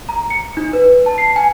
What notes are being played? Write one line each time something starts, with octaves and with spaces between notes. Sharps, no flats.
A#5
C#7
D#4
B4
A5
C7
G#5